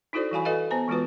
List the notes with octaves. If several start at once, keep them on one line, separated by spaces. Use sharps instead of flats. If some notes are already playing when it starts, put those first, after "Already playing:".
D#4 E4 F#4 A4 C5 D5
E3 G3 F#4 F5 G#5 B5
F#4 A4 B4 D#5 F5
B3 C5 G#5 A#5
E3 G#3 B3 F4 F#4 B4